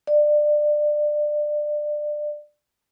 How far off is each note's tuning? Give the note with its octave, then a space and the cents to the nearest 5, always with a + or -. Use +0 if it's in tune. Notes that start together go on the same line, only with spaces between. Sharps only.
D5 +25